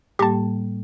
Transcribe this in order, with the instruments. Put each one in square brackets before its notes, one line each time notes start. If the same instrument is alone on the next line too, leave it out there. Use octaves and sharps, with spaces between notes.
[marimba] A2 G3 A#3 [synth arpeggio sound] G4 A5